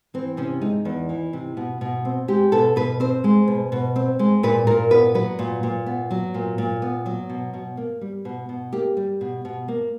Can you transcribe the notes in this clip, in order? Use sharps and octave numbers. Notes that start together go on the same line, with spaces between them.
E3 C4
C3 C#4
G#3 D#4
E2
E3
C3
B2
B2
C4
G#3 G4
B2 A4
B2 B4
C4 C5
G#3
B2
B2
C4
G#3
A#2 B4
A#2 A#4
B3 B4
F#3 B4
A#2
A#2
B3
F#3
A#2
A#2
B3
F#3
B2
B2
A#3
G3
B2
B2
A#3 G4
G3
B2
B2
A#3